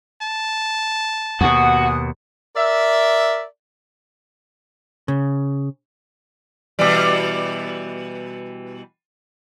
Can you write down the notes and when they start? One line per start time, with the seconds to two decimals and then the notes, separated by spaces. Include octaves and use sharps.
0.22 A5
1.41 D#2 B2 F#4 F#5 G#5 D#6
2.56 A#4 D5 E5
5.08 C#3
6.79 B2 E3 G3